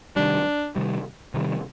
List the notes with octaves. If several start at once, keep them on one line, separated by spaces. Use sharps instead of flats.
C3 D#3 G3 D4
C3 D#3 G3
C3 D#3 G3